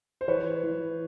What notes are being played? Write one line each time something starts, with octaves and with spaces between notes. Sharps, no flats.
C5
E3 B4 C#5
E3